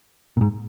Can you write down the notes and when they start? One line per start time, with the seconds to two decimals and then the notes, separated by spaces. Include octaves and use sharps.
0.37 A#2
0.41 G#2